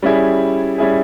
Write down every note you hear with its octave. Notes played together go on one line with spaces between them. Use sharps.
G3 C#4 E4 G#4
G3 C#4 E4 G#4